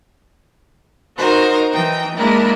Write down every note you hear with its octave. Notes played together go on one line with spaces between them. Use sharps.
D#4 F#4 A#4 C5
E3 D#4 G5
G#3 A#3 D4 E4 A#4